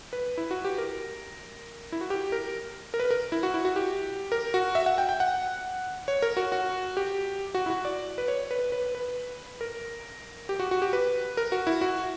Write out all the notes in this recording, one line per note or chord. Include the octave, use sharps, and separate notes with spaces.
B4
E4
F#4
G4
A#4
E4
F#4
G4
A#4
A#4
B4
A#4
E4
F#4
E4
F#4
G4
A#4
F#4
E5
F#5
G5
G5
F#5
C#5
A#4
F#4
F#4
G4
F#4
E4
F#4
D5
B4
C#5
B4
B4
B4
A#4
G4
F#4
F#4
G4
B4
A#4
F#4
E4
F#4